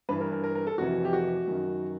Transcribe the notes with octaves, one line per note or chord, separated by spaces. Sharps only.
G2 E3 B4
A#4
A#4
A#4
A#4
A4
F2 C3 E3 F#4
G4
F#4
F#2 D#3